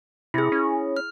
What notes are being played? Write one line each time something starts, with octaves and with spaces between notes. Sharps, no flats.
C3 E4 G#4
C#4
F6